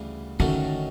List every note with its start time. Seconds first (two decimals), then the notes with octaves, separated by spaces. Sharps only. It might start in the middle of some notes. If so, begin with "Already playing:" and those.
Already playing: D2 C#3 E3 G3
0.39 F#2 D3 D#3 F#3 A3 C#4